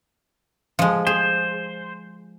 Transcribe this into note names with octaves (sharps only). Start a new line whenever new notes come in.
F3 G#3
G#4 C5